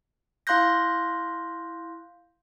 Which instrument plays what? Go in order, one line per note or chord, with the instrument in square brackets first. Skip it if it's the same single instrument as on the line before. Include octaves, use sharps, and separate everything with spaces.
[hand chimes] E4 F5 C6 F#6 G6 A#6